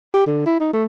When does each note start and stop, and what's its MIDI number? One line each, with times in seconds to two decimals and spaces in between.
0.14 0.24 67
0.27 0.46 50
0.46 0.60 64
0.60 0.70 63
0.73 0.85 57